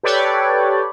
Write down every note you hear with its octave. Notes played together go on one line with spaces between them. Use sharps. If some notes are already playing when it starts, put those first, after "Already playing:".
G4 A4 B4 C#5 D5 G5